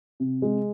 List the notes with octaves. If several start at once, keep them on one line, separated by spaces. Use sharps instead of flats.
C3
G#3